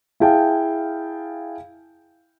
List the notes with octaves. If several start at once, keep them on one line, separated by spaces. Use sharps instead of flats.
E4 G#4 F5 G5 A5